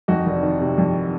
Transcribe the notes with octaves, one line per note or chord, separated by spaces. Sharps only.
F2 D#4 F#4
F1
D#3
C3
F2